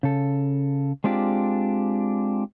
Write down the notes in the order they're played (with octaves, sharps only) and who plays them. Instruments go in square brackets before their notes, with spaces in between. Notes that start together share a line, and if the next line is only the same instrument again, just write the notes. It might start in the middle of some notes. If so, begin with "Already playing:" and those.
[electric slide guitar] C#3 A4
G#3 C4 D4 F4 G4